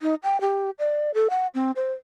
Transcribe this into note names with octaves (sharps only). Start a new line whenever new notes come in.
D#4
G5
G4
D5
A4
F#5
C4
C5